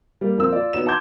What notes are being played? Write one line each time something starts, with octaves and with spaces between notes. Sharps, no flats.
G3 A#3
F2 A#3 C4 E6
F4 D5
B3 D#4 F#4 C#5 E7
F#5 A5 C6 D6 G6 G#6